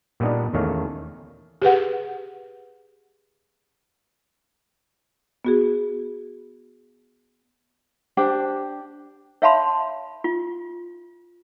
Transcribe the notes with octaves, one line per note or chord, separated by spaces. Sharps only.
A#2 G3 B3 D4 D#4
E2 D#3 A3 C#4 F5
G4 G#4 B4 F#5
B3 F#4 G#4
D4 G4 C5 G5
C#5 E5 F5 A5 B5 C6
F4